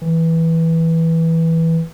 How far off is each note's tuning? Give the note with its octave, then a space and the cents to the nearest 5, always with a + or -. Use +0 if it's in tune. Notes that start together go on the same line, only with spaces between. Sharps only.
E3 -10